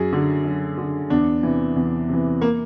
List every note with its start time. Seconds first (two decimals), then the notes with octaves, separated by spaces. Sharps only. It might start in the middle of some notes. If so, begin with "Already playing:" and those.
Already playing: F#2 G#4
0.12 D3
0.45 F#2
0.77 D3
1.10 E2 D4
1.43 C3 E3
1.76 E2
2.09 C3 E3
2.41 A#3